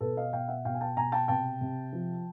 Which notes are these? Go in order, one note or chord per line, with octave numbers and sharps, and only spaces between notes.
B2 A4 B4
D#5 F5
B2 F5 G5
E5 F#5
B2 F5 G5
G#5
G5 A5
B2 G#5 A#5
G5 A5
C3 G5 A5
C3
F3